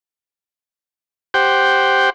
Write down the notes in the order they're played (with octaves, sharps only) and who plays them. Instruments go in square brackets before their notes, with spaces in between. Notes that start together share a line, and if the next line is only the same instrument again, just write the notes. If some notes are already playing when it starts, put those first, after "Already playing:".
[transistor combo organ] G4 C5 F#5 G5